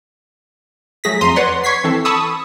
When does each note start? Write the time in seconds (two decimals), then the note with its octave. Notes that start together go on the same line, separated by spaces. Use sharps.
1.04 F#3 A3 G#4 A#6 B6
1.21 F2 A#5 C6 C7 D#7
1.36 B4 C#5 D5 F#5 C6
1.64 C#6 G#6 B6 C7
1.84 E3 C4 A4
2.05 A5 B5 C#6 D#6 E6